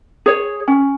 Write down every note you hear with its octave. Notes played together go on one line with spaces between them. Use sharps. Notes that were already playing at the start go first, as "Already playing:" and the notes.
G#4 C#5
C#4